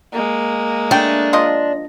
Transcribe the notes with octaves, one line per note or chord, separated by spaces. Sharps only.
G#3 A#3
A3 D4 G5
F3 F4 D#5